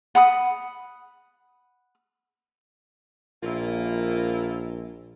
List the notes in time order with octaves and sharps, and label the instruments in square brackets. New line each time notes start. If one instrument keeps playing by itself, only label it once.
[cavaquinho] F#5 B5 D#6
[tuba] A#1 [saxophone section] A#3 E4 F4